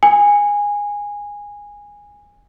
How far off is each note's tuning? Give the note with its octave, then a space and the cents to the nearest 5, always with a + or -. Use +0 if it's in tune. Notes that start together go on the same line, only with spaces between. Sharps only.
G#5 -15